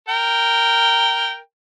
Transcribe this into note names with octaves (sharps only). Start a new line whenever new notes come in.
A#4 G5